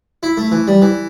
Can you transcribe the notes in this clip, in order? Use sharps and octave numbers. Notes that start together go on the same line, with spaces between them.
E4
A3
E3
G3
E3